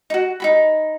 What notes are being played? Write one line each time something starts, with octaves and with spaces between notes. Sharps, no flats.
D#4 F#4
D#4 F#4 B5